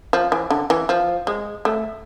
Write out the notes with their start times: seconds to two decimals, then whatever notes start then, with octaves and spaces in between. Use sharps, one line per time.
0.13 F3
0.32 E3
0.50 D3
0.70 E3
0.89 F3
1.27 G#3
1.65 A3